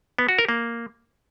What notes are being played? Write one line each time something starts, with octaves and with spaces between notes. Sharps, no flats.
B3
F#4
A#4
A#3